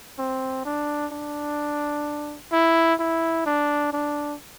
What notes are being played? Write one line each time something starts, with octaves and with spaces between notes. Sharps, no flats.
C4
D4
D4
E4
E4
D4
D4